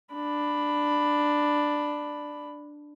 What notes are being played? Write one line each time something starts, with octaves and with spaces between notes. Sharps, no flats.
D4 B5